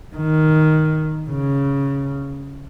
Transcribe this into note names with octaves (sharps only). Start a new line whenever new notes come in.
D#3
C#3